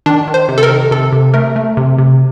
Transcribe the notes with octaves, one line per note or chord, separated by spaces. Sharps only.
D#3 D4
D#3
C5
C3
A4
A#4
D#3
C3 A4
C3
A3 A#4
A3
C3
C3